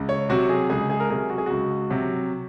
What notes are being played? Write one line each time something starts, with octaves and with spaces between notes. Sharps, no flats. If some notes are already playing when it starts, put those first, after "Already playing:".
Already playing: C#2
C#5
C3 F#3 F#4
G#4
C#2 G#4
G#4
A#4
C3 F#3 G#4
F#4
G#4
C#2 F#4
C3 F#3